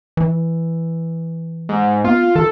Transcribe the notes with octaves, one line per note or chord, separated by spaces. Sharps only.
E3
G#2
B3 F4
E3 A4